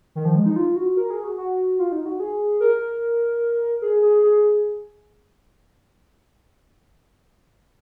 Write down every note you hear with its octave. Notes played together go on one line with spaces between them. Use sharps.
D#3
F3
G#3
D#4
F4
F#4
A#4
G#4
F#4
F#4
F4
D#4
F#4
G#4
A#4
G#4
G#4
G#4